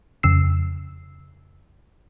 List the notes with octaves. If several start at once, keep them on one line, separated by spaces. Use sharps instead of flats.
F2 C#3 E6 C7